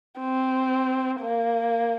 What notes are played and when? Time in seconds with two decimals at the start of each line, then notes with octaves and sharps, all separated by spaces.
0.20 C4
1.21 A#3